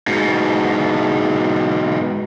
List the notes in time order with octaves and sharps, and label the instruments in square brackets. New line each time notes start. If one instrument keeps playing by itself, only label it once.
[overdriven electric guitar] G#2 B2